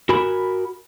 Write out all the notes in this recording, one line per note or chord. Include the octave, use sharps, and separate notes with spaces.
F#4 A#4 G#5 B5